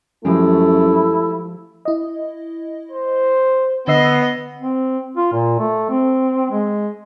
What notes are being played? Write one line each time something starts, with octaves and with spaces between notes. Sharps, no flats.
F#2 F3 G#3 A3 E4 G4
E4 D#5
C5
D3 B3 D#5 E6 C7
C4
F4
A#2
A3
C4
G#3